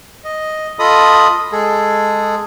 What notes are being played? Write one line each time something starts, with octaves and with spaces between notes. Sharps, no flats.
D#5
F4 A4 D#5 B5 D#6
G#3 G#4 A4